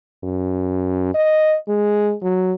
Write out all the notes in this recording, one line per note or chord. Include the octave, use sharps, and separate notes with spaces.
F#2
D#5
G#3
F#3